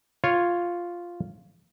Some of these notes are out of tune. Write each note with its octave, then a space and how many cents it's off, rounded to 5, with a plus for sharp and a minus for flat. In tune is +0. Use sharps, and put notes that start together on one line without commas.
F4 +0 C#5 +0